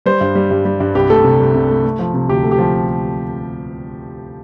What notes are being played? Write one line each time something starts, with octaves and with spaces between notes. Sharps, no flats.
G3 C5
G2
G3
G2
G3
G2
C2 G4
A3 A4
C3
C2
C2
A3
A3
F3
C3
D2 G4
A3
G4
F3